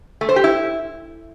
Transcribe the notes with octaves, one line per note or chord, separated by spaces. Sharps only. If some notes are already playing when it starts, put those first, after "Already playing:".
A3
C5
G4
E4